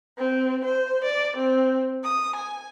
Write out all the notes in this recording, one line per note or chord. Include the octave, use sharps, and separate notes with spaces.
C4
C5
D5
C4
D#6
G#5